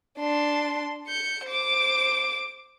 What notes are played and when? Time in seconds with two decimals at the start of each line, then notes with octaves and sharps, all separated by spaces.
0.19 D4 C6
1.07 G6 C#7
1.46 C5 D6